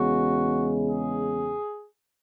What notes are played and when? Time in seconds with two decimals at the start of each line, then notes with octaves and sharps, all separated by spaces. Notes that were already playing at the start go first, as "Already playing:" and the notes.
Already playing: E2 C#3 G#3 F#4
0.87 G#4